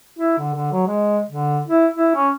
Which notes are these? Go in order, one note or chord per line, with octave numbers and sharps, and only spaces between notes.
E4
D3
D3
F#3
G#3
D3
E4
E4
C#4